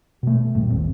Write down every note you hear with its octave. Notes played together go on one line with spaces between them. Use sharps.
B2 A3
D#1 G2 A#2
G#1 D#2 C4